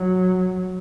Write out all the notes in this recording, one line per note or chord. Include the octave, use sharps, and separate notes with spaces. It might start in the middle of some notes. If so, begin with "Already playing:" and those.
Already playing: F#3